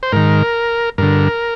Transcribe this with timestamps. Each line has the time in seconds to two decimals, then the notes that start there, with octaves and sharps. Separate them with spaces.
0.03 C5
0.12 G#2 D#3 A#4
0.98 G2 D3 A#4